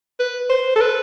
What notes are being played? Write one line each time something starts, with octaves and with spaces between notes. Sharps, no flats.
B4
C5
A4
B4